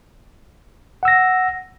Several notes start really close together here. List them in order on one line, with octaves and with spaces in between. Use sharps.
F#5 E6 A#6